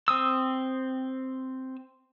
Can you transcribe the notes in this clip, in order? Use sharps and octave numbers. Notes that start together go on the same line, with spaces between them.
C4 D#6 E6